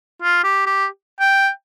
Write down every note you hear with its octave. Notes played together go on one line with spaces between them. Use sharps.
F4
G4
G4
G5